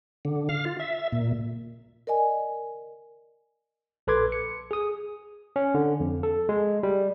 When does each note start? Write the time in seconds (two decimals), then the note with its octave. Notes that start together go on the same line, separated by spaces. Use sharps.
0.25 D3
0.49 F5
0.65 F4
0.80 E5
0.99 E5
1.12 A#2
2.07 A#4 D5 D#5 G#5
4.07 A#1 A4 B4 C6 D6 G#6
4.32 C#7
4.71 G#4 D#6
5.56 C#4
5.74 D3
6.00 F2
6.23 A4
6.49 G#3
6.83 G3